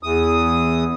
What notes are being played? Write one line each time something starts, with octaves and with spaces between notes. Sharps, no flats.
E2 D#6